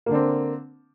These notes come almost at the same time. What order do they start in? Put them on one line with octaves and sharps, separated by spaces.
A#3 D3 D4 C4